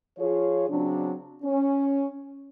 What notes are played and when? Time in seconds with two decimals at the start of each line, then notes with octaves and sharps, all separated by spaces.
0.18 F3 F4 G#4 C#5
0.69 C#3 F#3 C4 D4
1.44 C#4